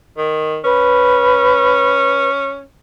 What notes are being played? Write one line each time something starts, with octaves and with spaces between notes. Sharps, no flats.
D#3
C#4 B4